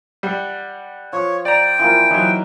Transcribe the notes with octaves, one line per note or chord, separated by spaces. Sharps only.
G3 F#5
F3 C#5
D5 G5 A#5
E3 F3 A#3
E3 F#3 D#4